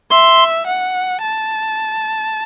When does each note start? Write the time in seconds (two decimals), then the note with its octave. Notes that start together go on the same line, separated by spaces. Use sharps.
0.11 E5 C6
0.67 F#5
1.22 A5